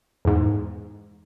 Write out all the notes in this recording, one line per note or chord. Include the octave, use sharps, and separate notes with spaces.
E2 G#2